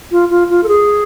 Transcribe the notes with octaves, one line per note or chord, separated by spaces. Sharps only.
F4
F4
F4
A4
G#4